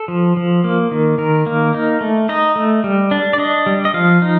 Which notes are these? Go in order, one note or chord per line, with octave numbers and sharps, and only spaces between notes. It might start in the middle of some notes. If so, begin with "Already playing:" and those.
Already playing: A4
F3
F3
A#3
D#3
D#3 A#4
A#3
D#4
A3
D#4 D#5
A3
G3
D4
D5
D4 D#5
G3
D#5
F3 F5
D#4